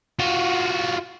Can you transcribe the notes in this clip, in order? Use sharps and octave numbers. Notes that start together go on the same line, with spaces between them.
F4 F#4